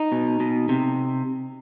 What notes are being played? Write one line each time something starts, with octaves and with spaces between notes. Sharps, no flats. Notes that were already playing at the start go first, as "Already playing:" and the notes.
Already playing: D#4
B2
B2
C3